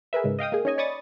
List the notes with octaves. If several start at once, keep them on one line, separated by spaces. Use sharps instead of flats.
G#4 A#4 B4 E5
G#2 C#3 G#3
D#5 F5 G5 D#6
A#3 G#4
C#4 D#4 C#5 D#5 G#5
C#5 D5 B5 C#6 D#6 A6